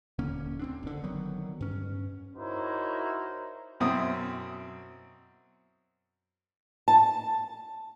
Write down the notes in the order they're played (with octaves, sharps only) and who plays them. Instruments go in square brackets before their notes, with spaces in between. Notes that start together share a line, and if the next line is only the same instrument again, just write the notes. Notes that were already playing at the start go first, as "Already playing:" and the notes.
[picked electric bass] D#1 D3 A#3 C#4
D2 C4 D4
F#1 D3
D3 D#3 F#3 B3
G2 C#4
[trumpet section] D#4 E4 F#4 A#4 C5 C#5
[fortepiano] F#2 B2 C4 E4 D#6
[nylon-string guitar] A5